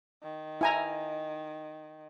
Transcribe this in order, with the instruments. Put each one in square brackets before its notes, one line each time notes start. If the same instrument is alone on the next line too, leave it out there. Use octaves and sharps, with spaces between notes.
[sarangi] D#3
[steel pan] E4 G#5 A#5